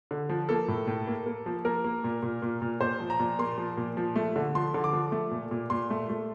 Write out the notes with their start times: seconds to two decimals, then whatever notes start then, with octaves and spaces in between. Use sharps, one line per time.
0.11 D3
0.29 F3
0.49 A#3 A4
0.68 A2
0.87 A2
1.07 A#3
1.26 A#3
1.46 F3
1.65 A#3 A#4
1.85 A#3
2.04 A#2
2.22 A#2
2.42 A#2
2.62 A#2
2.81 A#2 C5
3.00 F3
3.10 A#5
3.19 A#2
3.39 A#3 C6
3.58 F3
3.77 A#2
3.97 F3
4.16 A3
4.36 D3
4.55 F3 C6
4.74 D3
4.84 D6
4.93 F3
5.12 A3
5.31 A#2
5.51 A#2
5.70 A#2 C6
5.90 A3
6.09 A3